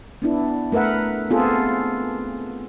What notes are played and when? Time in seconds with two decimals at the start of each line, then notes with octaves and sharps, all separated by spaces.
0.22 B3 D4 E4
0.72 A3 A#4 B4 E5 F#5
1.30 B3 C4 F4 G#4 A4